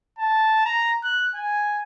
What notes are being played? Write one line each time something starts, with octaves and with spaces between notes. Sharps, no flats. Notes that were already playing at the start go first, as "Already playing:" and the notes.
A5
A#5
F#6
G#5